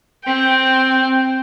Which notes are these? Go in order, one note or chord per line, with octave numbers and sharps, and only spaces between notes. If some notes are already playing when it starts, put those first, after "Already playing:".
C4 G5